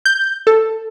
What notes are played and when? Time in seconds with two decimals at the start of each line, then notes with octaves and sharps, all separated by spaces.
0.05 G6
0.47 A4